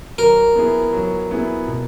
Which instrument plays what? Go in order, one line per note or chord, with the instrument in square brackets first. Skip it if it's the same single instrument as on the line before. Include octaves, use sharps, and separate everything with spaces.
[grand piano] F#3 [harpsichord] A#4
[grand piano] B3 E4 G#4
F#3
B3 E4 G#4
B2